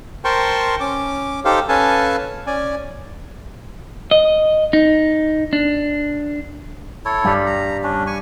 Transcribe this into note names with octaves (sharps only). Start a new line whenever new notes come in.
A#4 C5 G5 A5 C6 C#6
C#4 D6
D#4 G4 A4 C5 F5
C#4 A4 B4 F5 G#5 A5
C#4 D5 G#5
D#5
D#4
D4
E4 A4 C#5
G2 G3
A#5
C#4 D4
G#5 C#6